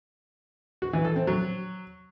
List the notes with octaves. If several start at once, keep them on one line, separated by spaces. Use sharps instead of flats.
F#4
E3
A4
C4
F#3